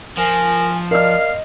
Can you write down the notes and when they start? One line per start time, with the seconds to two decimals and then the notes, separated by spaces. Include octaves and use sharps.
0.18 F3 A#4 G#5
0.91 A#4 D5 D#5 F5 F6